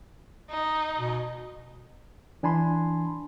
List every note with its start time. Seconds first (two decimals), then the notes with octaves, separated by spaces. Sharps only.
0.50 D#4
1.00 B2
2.43 E3 D4 G#5 A5 B5 C6